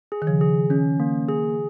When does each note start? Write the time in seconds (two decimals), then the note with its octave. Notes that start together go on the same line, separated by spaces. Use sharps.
0.12 G#4
0.22 D#3
0.27 C#3 F3
0.41 G#4
0.70 D#3 C#4
1.00 A#3
1.29 G#4